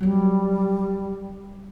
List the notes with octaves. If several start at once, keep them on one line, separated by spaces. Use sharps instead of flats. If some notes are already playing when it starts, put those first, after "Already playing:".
F#3 G3 A#3